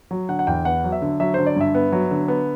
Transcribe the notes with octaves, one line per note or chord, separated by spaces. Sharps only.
F#3
D3 F#5
F#5
E2 G5
B3 F#5
F#3
E5
D3
F#3 E5
D3 C5
D5
G2 E5
B3
F#3
D3
B3